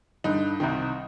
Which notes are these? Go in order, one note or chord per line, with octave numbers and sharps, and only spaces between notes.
G2 D3 D#4
C2 C3 D#3